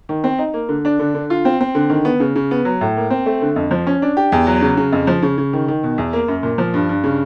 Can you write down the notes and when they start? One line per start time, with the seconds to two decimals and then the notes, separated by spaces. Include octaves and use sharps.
0.09 D#3
0.24 C4
0.39 D#4
0.54 A#3
0.69 D3
0.85 D4
0.99 D3
1.15 D3
1.30 F4
1.45 C4
1.61 C4
1.75 D3
1.90 D#3
2.05 B3
2.20 C#3
2.36 C#3
2.51 B3
2.65 F#3
2.81 A2
2.96 A#3
3.10 C4
3.26 A3
3.42 D3
3.56 F2
3.71 F3
3.87 C#4
4.02 D4
4.17 G4
4.32 E2
4.47 F#3
4.62 C#3
4.77 C#3
4.93 F2
5.07 F3
5.23 C#3
5.38 C#3
5.53 D#3
5.68 D#3
5.83 B2
5.98 E2
6.13 A#3
6.28 F#2
6.43 A#2
6.58 F3
6.74 G2
6.89 G2
7.04 C#3